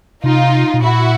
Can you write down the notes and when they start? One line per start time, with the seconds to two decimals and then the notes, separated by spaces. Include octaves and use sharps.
0.24 C3 D#4 F4
0.74 B2
0.81 A#2 E4 F#4